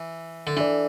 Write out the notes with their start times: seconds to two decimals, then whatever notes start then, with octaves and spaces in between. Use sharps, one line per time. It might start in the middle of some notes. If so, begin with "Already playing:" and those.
Already playing: E3
0.47 D3
0.56 E3 D4 A4 D5